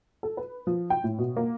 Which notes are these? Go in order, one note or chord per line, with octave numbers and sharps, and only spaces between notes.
A4
B4
F3
G5
A2
B2
A#3